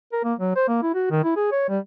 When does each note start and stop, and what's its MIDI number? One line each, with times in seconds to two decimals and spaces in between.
0.12 0.21 70
0.24 0.34 58
0.39 0.53 54
0.56 0.64 72
0.68 0.82 58
0.82 0.94 64
0.94 1.10 66
1.10 1.23 51
1.24 1.33 64
1.36 1.50 68
1.52 1.64 73
1.69 1.79 55